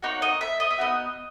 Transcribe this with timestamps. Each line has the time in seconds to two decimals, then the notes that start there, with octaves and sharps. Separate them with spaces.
0.02 A#3 D#4 F#4 C#5
0.22 D#5
0.41 E5
0.60 D#5
0.71 E5
0.78 B3 D#4 F#4 D#5